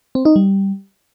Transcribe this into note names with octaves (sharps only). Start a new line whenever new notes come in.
C4
D#4
G3